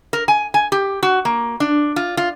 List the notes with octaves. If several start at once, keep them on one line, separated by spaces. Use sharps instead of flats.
A#4
G#5
G#5
G4
F#4
A#3
D4
F4
F4